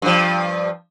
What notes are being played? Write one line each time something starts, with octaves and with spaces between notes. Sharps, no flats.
G2 F3